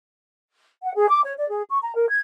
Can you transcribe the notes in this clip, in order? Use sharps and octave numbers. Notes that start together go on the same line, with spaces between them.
F#5
G#4
D6
C#5
D5
G#4
C#6
A#5
A#4
G#6